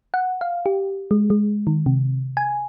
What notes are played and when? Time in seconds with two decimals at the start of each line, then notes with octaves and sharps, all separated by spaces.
0.14 F#5
0.41 F5
0.66 G4
1.11 G#3
1.30 G#3
1.67 D#3
1.86 C3
2.37 G#5